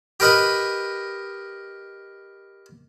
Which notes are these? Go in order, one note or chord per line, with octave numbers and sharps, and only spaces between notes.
G4 A#4 B4 D#5 B5